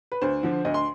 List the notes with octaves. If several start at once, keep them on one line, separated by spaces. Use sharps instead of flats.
B4
D2 C5
D3 F3
D2 D#5
C6